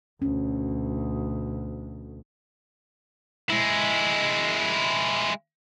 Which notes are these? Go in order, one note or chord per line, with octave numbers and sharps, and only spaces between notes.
D2 B2 C#4
G#3 E4